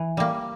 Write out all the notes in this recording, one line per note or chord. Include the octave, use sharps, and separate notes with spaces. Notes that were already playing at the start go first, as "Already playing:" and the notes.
Already playing: E3
G3 A#3